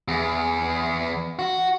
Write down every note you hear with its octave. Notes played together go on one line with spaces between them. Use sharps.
E2
F#4